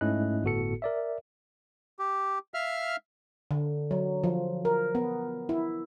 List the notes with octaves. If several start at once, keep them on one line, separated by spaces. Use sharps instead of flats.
G#2 A3 C#4 E4 D#5 F#6
G1 A2 B3 F#4 A4 C#7
A#4 D5 E5
G4
E5 F5 F6
D3
F#3
F3
A#4
B3
E4